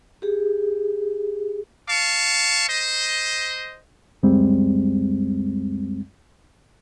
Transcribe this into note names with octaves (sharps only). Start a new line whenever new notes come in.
G4 G#4
F5 A5 C#6
C5 D#5
C#2 F#2 G3 G#3 C4